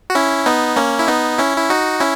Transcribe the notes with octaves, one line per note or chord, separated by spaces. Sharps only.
F#4
C#4 E4
B3 D#4
A#3 C#4
E4
B3 D#4
C#4 E4
E4
D#4 F#4
C#4 E4